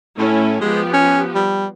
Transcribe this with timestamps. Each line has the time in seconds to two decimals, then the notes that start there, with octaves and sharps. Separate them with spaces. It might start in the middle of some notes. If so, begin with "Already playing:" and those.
0.19 A2 A3 C#4 E4
0.61 F3 G#3 B3 G4
0.93 C#4
1.35 G3